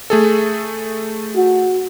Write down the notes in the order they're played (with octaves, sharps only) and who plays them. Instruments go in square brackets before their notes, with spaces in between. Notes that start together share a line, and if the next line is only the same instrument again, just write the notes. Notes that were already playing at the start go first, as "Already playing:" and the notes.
[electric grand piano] A3 G#4 A4
[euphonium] F#4